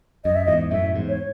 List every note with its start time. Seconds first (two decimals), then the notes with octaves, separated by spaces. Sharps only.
0.25 F#2 D#5
0.35 E5
0.45 E2 G#2 D#5
0.71 F#2 A2 E5
0.95 E2 G#2
1.09 C#5